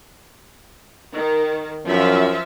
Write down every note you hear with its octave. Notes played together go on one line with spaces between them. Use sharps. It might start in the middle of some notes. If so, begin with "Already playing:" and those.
D#3
F#2 F3 E5 F5